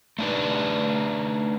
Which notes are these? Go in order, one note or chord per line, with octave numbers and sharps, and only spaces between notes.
A3 D4 D#4 B4